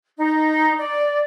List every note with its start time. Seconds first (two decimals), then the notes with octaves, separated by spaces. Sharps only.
0.16 D#4
0.77 D5